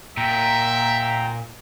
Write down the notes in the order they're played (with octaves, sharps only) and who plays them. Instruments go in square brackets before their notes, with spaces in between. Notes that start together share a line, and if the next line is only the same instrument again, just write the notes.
[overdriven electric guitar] A#2 [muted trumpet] E5 [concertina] G5 A#5